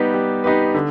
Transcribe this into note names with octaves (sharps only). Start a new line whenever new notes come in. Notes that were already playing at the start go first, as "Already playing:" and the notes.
Already playing: G3 B3 D#4 G4 B4
G3
B3 D#4 G4 B4
D3